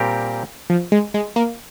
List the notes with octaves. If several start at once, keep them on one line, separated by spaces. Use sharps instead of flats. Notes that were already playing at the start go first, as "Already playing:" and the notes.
Already playing: A#2 G3 C4 G4 A#4
F3
G#3
G#3
A#3